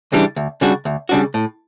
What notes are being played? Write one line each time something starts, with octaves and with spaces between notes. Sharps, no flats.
C#3 E3 G3 D4
D2
C#3 G3 D4 F#4
D2
C#3 G3 D4 F#4
A2